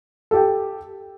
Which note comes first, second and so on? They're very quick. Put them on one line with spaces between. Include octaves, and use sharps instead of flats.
A4 G4 G5